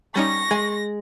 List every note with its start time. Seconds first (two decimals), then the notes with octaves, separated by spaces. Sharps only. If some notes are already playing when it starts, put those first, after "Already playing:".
0.16 G3 C#4 D#4 C#6 A#6
0.51 G#3 G#5